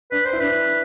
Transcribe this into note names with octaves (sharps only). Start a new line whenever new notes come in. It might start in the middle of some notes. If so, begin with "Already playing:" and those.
D4 B4
C5
E4
D4 B4